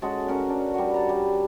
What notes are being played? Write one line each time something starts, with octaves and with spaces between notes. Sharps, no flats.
G#3 C#4 F#4 A4
C#4 A#4 B4 D#5
D4
G3 F#4
A5 A#5
G3